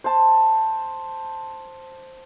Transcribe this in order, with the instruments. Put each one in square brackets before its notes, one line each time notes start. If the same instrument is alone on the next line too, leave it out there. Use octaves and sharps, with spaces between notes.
[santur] C5 A5